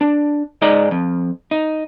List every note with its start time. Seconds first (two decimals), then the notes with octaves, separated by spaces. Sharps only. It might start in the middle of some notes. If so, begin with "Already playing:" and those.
0.01 D4
0.62 G#2 G#3 D#4 D5 D#5 A#5
0.91 F2
1.51 D#4